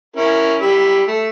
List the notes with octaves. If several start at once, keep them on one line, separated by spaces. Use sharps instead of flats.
C#4 E4 A#4
G3 B5 E6
A3